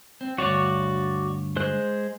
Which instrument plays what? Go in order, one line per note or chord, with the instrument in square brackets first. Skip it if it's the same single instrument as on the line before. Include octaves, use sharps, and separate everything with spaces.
[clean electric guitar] C4
[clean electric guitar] D2 G2 C#5 [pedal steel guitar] F#4 D5
[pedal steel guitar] G#3 C5 F#6